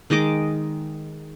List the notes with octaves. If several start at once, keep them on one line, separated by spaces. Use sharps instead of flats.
D#3 G#3 D#5 D6